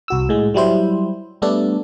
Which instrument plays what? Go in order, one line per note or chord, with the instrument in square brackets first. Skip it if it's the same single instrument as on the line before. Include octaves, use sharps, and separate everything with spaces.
[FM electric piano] C2 F#4 E6
A2 G#3
F#3 G3 E4 C5
G3 A3 B3 D4 A4